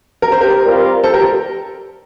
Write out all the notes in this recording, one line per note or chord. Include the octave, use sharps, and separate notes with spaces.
A#4
C5
G4 A#4
G3 C4 F4 A#4
A4 C5
G4 A#4